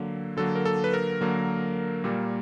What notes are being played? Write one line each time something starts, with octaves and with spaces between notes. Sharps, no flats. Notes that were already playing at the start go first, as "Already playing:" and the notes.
Already playing: D3 F#3 A#3
D3 F#3 A#3 A4
A#4
A4
B4
A#4
D3 F#3 A#3
A#2 G3 A#3